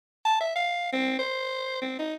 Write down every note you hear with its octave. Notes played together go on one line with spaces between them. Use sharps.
A5
E5
F5
C4
C5
C4
D#4